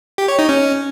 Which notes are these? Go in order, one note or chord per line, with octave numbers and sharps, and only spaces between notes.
G4
C#5
D#4
C#4